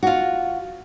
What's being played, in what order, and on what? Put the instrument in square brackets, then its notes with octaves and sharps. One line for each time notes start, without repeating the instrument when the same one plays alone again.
[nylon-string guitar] F4 F#4